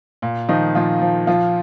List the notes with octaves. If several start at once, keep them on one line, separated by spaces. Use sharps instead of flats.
A#2
D#3 F3 D#4
A#2 F3 F4
F3
F3 F4